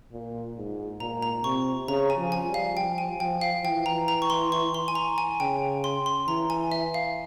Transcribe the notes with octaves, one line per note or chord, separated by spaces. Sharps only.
A#2
G#2
A#2 A#5
A#5
C3 C#6
C#3 A#5
G#5
F3
G#5
G3
F5
F3 G5
G#5
F3 G5
F5
E3 G5
A#5
A#5
C#6
C6
C#6
C6
G#5
A#5
G#5
C#3 G5
C6
C6
E3 A#5
G#5
E5
F5